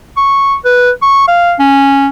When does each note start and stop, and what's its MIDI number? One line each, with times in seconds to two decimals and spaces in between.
0.17 0.55 85
0.65 0.90 71
1.02 1.25 85
1.28 1.53 77
1.59 2.08 61